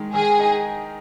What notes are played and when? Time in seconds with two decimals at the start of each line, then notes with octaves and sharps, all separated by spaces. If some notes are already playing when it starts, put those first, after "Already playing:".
Already playing: D#3 G#3 D#4
0.13 D#3 G#4
0.39 D#4